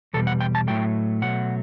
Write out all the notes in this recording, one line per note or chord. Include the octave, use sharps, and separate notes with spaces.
E2 B2 G3 A4
F#5
G5
A5
A2 F#3 A3 G5
B2 F#3 A3 F#5